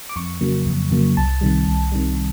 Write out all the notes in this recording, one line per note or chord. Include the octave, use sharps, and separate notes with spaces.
D6
F2 C#6
C#3 F#3 A#3
F2
C#3 F#3 A#3
C2 A5
C3 D#3 G3
C2
C3 D#3 G3